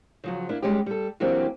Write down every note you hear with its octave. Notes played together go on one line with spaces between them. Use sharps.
C#3 F3 F#3
A#3 D4 E4
G3 G#3 C#4 D#4 G4
G3 A4
E3 F#3 A#3 C4 D4 G4